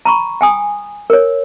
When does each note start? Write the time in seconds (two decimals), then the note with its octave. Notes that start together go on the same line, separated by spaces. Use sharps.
0.05 A#5 B5 C#6
0.41 G5 G#5 D#6
1.10 A#4 C#5